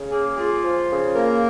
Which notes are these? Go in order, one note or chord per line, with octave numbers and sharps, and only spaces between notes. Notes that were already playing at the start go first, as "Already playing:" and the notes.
Already playing: C#3
A#3 G#4
F4 G#4
F3
C#3
A#3 A#4